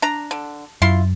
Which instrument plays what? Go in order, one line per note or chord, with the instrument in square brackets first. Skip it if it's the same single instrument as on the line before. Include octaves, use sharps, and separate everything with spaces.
[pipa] D4 A#5
D3
[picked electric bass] F#2 [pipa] E4 F4 C6